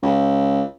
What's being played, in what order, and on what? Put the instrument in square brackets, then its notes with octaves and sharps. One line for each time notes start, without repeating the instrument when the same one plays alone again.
[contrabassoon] C#2